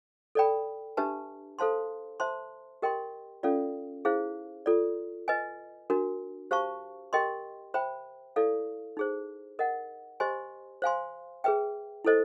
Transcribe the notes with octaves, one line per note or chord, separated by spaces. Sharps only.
A4 D5 G5 B5
D4 G4 B4 E5 A5
A4 C5 F5 A5 C6
C5 E5 A5 C6
G4 A#4 D#5 G5 C6
C#4 F4 A4 D5 F5
E4 G#4 C5 F5
F4 A4 D5
B4 D#5 G#5
D4 F#4 A#4
G4 C5 F5 A5 C#6
G4 A#4 D#5 G5 C6
C5 E5 G5 B5
E4 A4 D5 F5
D#4 G#4 C5
A#4 D#5 F#5
G4 C5 D#5 G#5 C6
C5 F5 G#5 C6
G#4 B4 E5 G5
E4 A4 C5 D#5